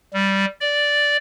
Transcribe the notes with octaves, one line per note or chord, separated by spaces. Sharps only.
G3
D5